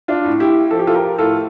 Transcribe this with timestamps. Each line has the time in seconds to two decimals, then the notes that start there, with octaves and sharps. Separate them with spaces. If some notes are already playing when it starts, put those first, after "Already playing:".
0.08 D4 F4
0.25 A2
0.40 E4 G4
0.71 F3 A4
0.79 G4
0.87 F4 A4
0.94 G4 A#4
1.18 A2 F4 A4